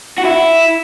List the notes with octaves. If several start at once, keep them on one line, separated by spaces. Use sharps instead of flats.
F#4
E4